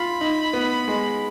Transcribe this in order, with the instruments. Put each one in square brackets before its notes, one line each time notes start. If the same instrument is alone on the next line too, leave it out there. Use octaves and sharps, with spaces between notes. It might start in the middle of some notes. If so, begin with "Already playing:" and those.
Already playing: [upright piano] F4 [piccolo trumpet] B5
[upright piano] D#4
B3
G#3